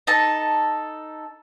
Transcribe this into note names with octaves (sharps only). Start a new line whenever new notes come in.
D#4 A4 A5